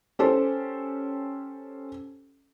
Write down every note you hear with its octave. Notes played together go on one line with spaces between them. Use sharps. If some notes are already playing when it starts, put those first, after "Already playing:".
C#4 G4 A4 C5